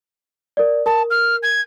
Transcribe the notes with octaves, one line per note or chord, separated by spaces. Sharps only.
A#4 D5
A#4 A5
F6
G#6